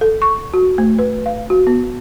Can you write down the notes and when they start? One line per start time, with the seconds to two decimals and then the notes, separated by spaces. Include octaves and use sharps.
0.01 A4
0.22 C#6
0.54 F#4
0.78 A3
0.99 B4
1.26 F5
1.50 F#4
1.67 B3